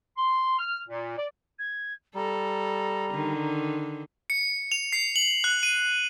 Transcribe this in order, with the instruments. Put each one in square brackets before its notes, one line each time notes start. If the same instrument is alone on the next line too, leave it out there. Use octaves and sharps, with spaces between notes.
[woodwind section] C6
F6
A#2
D5
[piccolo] G#6
[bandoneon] G3 [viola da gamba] A4 [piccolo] A#5
[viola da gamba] D3 D#3
[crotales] C#7
F7
C7
F#7
F#6
D#7